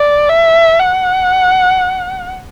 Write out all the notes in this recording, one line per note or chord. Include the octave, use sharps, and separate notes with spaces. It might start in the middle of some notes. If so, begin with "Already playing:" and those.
Already playing: D5
E5
F#5